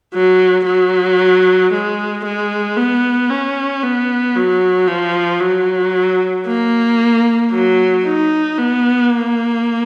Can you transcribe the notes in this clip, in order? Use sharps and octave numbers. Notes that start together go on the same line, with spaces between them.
F#3
F#3
G#3
G#3
B3
C#4
B3
F#3
F3
F#3
A#3
F#3
D#4
B3
A#3